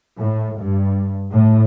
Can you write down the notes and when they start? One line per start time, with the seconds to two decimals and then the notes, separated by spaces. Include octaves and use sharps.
0.19 A2
0.60 G2
1.32 A2